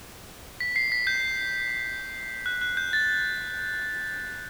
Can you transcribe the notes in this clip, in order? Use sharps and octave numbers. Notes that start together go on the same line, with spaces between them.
B6
C7
B6
G6
F#6
F#6
G6
A6